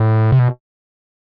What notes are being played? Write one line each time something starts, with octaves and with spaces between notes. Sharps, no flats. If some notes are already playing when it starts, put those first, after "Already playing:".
Already playing: A2
C3
B2